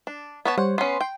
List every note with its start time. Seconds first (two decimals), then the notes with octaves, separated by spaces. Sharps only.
0.07 D4
0.45 B3 C#5 A5
0.58 G3 C5 C#5 F#5
0.78 B3 C#4 C6 C7
1.01 G5